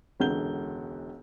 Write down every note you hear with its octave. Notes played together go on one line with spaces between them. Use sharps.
E1 C#2 D3 F#5 G6 G7